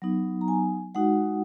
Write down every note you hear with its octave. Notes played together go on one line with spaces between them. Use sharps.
F#3 B3 D#4
A#5
G#5
G#3 D#4 F#4 F#5